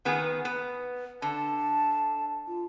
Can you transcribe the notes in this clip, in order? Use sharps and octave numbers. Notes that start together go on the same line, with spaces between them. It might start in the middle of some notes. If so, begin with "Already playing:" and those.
D#3 B3 G#4
B3
D3 A5
F4